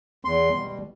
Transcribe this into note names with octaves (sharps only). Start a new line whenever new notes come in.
E2 C6
B2 G3